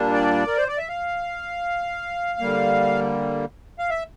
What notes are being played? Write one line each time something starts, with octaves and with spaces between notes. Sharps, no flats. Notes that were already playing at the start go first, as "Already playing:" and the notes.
Already playing: A#2 G3 A#3 D4
D5
A#4
C5
D5
E5
F5
D3 G3 A#3
F5
E5